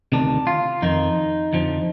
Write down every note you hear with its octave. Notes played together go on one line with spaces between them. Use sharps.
D2 C3 D#3 D4
F4
F2 D#3 D#4
F2 D3 F3